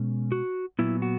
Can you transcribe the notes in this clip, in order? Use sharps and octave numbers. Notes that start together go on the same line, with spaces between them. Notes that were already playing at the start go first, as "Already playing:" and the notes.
Already playing: B2 G#3 C#4
F#4
A#2 F#3 B3 E4
F#4